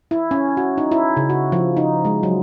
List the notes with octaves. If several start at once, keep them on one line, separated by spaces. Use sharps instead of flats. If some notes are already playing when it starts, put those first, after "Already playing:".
E4
C#4
F#4
D#4
E4
C#3
F#4
F3
D#4
G#3
F#3